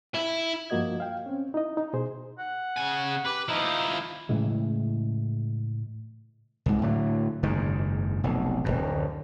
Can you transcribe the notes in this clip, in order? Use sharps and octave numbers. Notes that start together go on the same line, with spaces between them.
E4
G2 F3 A#3 F#4 D#5 G#6
F5 G5
C4 C#4
D#4 E4 D#5
D#4
B2 G#4 C5
F#5
C#3 G#5
G4 B4
F3 D#4 E4
A2 C#3 E3 G#3
C2 G#2
A2 D3 F#3
F#1 G#2 D#3
F1 B1
D1 G#1 F#2